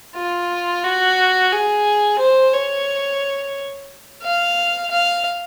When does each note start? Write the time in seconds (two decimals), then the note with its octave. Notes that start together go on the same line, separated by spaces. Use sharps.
0.16 F4
0.84 F#4
1.52 G#4
2.19 C5
2.53 C#5
4.23 F5
4.91 F5